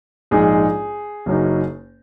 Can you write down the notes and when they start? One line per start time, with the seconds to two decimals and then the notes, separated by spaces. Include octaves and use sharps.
0.31 A#1 G#2 G#3 D#4 G#4
1.26 F#1 F#2 F#3 D#4